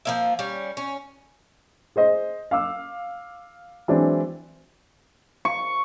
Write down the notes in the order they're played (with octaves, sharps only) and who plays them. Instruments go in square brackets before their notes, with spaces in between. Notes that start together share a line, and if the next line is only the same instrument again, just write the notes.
[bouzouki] F3 A#3 E5
G3 C#4
C#4
[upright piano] G#4 C5 D#5
F5 D6 E6
E3 F#3 G#3 C4 D4
[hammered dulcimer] C#6